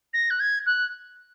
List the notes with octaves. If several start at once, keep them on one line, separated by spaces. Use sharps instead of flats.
A#6
F#6
G#6
F#6